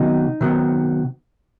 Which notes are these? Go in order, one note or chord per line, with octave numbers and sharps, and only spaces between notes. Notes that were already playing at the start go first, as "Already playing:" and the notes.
Already playing: C3 D#3 F#3 B3 D#4
C3 D#3 F#3 B3